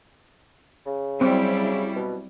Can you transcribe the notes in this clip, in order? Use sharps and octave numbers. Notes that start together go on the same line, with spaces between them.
C#3
F#3 G3 C4 E4
B2